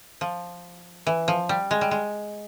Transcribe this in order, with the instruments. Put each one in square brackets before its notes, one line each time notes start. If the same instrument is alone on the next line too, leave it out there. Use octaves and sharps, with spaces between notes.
[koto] F3
E3
F3
G3
G#3
G3
G#3